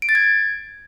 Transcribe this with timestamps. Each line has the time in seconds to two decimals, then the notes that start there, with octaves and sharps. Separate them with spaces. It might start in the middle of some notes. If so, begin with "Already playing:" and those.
0.02 D7
0.09 A6
0.15 G#6